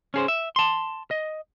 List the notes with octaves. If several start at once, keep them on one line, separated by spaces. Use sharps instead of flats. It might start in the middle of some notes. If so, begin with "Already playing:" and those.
C#4 G#4 C5
E5
A5 C6
D#5